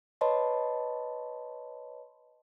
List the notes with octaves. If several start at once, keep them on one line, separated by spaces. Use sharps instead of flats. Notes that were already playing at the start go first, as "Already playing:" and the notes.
B4 C#5 D#5 A5 B5 C6